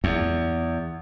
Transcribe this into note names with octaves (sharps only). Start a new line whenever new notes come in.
E2